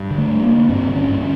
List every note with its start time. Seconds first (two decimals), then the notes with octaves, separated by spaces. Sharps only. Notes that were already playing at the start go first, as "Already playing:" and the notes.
Already playing: G2
0.11 D3
0.18 A3
0.30 G2
0.43 A#3
0.49 D3
0.69 G2 C4
0.88 D3
0.95 C#4
1.08 G2
1.21 C#4